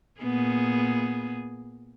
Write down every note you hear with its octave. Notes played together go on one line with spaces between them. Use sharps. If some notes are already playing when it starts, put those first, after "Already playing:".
A#2 B3 G#4